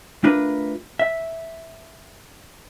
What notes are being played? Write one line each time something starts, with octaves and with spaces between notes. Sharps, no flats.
A3 D4 F4 A#4 B4
E5